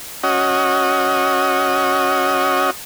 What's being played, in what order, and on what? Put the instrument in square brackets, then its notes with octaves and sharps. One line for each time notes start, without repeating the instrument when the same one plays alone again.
[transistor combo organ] C#4 F#4 D#5